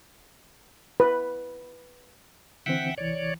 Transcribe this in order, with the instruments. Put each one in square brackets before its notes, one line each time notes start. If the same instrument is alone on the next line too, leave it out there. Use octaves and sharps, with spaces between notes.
[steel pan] B4
[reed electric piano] D3 E3 C4 [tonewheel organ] E5 F#5 G5
[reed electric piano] C2 E3 [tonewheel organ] C#5 D5